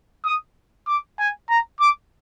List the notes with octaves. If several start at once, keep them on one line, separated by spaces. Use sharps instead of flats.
D#6
D6
G#5
A#5
D6